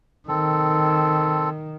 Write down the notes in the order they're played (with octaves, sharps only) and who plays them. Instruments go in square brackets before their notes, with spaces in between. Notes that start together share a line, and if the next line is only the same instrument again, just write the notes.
[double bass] D#3 [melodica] C4 A4